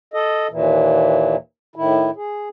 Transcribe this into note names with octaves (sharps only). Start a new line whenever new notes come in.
A4 D#5
D#2 A#2 E3
A2 D#3 E4
G#4